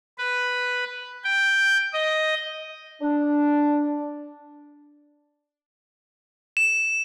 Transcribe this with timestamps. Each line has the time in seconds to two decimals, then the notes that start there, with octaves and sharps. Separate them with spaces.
0.18 B4
1.24 G5
1.93 D#5
3.01 D4
6.57 E7